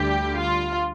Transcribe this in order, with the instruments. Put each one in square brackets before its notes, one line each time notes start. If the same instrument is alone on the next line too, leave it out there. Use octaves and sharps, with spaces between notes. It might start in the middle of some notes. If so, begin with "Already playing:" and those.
Already playing: [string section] D2 D3 G3 G4
F4